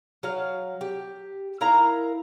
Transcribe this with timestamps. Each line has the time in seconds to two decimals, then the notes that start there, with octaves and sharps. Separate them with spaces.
0.23 F#3 F5
0.81 G4
1.61 E4 A#4 F5 A#5